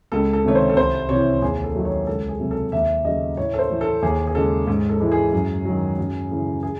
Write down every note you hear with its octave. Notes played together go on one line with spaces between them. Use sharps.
C#2 A4
A4
C3 D#3 A3 C#5
C5
A4
C2 C5
C3 E3 C#5
D#2 G#4
A4
D#3 F#3 A3
C#5
C#2 A4
G#4
C3 F#3 A3
A4
D#2 E5
C#3 F#3 A3 D#5
A2 C#5
A4
C5
E3 A3
A4
D#2 G#4
G#4
C#3 G#3 A4
G#2
A4
E3 G#3
G#4
F#2
D#3 F#3
F#2
C#3 E3 A3
G#4